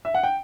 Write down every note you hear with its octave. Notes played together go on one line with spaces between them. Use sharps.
E5
F#5
G5